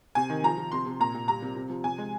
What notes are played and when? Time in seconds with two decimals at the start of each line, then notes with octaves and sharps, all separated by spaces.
0.15 C3 G#5
0.30 D#3
0.44 F3 A#5
0.58 F3
0.72 C3 C6
0.86 C3
1.00 A#2 A#5
1.14 A#2
1.28 G3 A#5
1.42 C3
1.56 C3
1.70 F3
1.84 C3 G#5
1.98 G#3